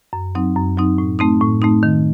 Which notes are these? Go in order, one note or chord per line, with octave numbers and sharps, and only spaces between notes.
F#2
F#3 C4 D#4
F#2
F#3 C4 D#4
A2
A3 C4 D#4
A2
A3 C4 D#4
D#3